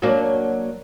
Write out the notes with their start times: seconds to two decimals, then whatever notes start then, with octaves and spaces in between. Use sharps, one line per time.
0.02 F#3 A#3 D4